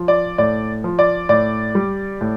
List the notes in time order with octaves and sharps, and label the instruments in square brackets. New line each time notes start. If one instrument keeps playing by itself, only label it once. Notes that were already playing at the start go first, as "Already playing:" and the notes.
Already playing: [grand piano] F3
D5
A2 D5
F3
D5
A2 D5
G3
A2